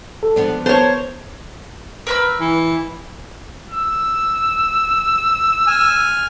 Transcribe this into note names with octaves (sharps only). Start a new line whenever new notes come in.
A4
F3 B3 D4
B3 A#4 C5 C#5 A5
A#4 B4 E6
E3
E6
G#5 F6